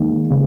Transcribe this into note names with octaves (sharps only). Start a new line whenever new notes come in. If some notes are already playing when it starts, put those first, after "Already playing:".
Already playing: D#2 G#3
C#3